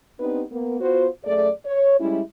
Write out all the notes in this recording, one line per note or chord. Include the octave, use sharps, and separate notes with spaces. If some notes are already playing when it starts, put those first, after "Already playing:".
B3 C4 D4 D#4 G4 B4
A#3 B3
B3 F4 F#4 C5
F#2 A3 G#4 D5
C#5
G3 G#3 C#4 E4